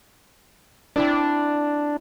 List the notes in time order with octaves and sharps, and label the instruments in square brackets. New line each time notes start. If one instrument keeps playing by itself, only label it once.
[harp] C4 E4 D5 [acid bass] D4